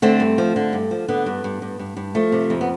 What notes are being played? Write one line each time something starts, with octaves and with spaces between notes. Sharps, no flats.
D3 A3 C4
G2
F3
D3
G2
F3
D3 B3
G2
G2
G2
G2
G2
F3 A3
C3
F2
B3